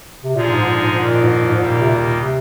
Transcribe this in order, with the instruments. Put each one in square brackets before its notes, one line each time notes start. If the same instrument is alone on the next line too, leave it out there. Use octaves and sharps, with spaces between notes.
[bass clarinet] C3
[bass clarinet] A#2 [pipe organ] D3 F3 G#3 D#4 G#4
[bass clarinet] G#2
A#2
G#2
[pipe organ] F2 D#3 A#3 [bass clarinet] A#2
[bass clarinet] G#2
A#2
G#2
[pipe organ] D#2 D#3 G3 A#3 [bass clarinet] A#2
[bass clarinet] C3
A#2
C3